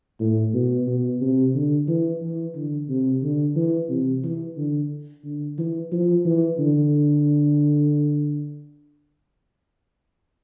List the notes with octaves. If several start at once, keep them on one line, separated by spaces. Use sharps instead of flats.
A2
B2
B2
C3
D3
E3
E3
D3
C3
D3
E3
C3
E3
D3
D3
E3
F3
E3
D3